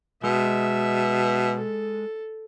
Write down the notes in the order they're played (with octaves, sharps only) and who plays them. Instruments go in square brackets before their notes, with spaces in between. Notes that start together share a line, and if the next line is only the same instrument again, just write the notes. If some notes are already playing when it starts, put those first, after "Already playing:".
[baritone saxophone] B2 [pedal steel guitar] G#3 [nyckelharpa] E5
[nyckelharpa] A4